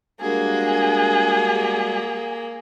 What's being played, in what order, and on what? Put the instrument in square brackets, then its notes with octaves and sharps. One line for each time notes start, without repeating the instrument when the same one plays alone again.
[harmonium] G3 G#3 F#4 [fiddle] A#3 [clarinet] D4 [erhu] G#4